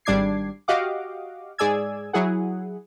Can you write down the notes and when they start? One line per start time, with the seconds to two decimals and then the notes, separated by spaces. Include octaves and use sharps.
0.05 G#1 G3 D4 D6 G#6 C7
0.68 F#4 G4 D#5 F5 F#5 D6
1.58 G#2 G#4 D5 G#5 E6 G#6
2.13 F#3 E4 G#4 F#5